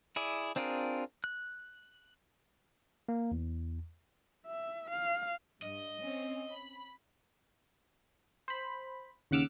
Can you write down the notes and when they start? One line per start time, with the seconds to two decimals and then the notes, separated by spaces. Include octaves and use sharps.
0.16 E4 G#4 D5
0.56 C4 D4 F4 G#4 A#4
1.24 F#6
3.09 A#3
3.31 E2
4.47 E5
4.90 F5
5.62 G2 D#5
6.01 C4 C#4
6.51 B5
8.48 C5 B5
9.31 D#2 C#3 F#5 D6 E6 F6